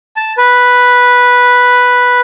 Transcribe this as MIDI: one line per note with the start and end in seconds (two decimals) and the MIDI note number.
0.16 0.33 81
0.38 2.21 71